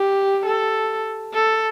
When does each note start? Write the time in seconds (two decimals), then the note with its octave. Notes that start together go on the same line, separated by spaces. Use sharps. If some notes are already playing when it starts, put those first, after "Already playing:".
Already playing: G4
0.46 A4
1.34 A4